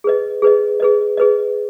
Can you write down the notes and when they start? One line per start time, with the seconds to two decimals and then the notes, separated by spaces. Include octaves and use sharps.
0.04 G#4 B4 D#5
0.42 G#4 B4 D#5
0.80 G#4 B4 D#5
1.17 G#4 B4 D#5